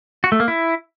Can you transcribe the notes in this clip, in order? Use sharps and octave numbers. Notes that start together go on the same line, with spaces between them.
F#4
A3
A#3
E4